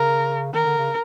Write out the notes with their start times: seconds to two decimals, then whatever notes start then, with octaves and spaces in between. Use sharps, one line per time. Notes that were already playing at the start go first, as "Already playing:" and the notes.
Already playing: C#3 A#4
0.53 D#3 A#4
0.66 D3
0.78 C#3